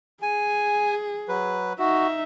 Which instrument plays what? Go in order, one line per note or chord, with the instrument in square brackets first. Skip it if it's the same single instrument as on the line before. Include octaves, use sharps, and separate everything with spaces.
[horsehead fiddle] G#4 [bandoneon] G#5
[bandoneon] F#3 B4
[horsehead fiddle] D#4 E5 [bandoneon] F#4